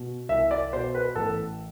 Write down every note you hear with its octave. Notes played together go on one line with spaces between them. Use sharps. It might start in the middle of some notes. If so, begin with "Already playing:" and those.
Already playing: B2
C2 E5
D5
B2 C5
B4
A1 A4